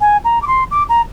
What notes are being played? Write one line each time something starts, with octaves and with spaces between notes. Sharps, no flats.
G#5
A#5
D6
C6
D6
A#5